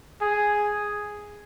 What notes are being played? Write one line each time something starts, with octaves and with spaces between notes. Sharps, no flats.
G#4